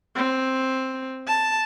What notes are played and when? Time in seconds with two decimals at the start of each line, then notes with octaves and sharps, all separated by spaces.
0.16 C4
1.28 A5